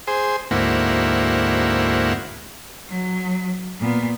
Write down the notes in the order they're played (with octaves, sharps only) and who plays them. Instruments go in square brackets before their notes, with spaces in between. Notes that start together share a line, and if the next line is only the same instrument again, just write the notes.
[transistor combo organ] G#4 C5
D2 G#2 A#3 C4 E4 F#4
[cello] F#3
A#2 B3